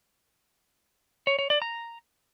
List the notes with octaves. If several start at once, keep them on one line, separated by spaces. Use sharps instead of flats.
C#5
C#5
D5
A#5